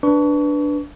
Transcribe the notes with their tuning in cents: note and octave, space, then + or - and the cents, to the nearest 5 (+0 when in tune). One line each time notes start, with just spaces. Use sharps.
D4 +0 B4 +0 C#6 +30